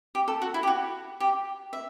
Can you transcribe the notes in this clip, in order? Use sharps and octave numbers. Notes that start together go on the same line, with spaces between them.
G4
A4
F#4
E4
G4
F#4
G4
E5